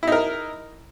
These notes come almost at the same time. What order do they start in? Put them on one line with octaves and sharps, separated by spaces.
E4 D#4 A#4